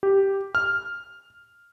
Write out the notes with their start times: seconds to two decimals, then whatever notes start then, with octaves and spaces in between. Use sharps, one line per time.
0.03 G4
0.55 F6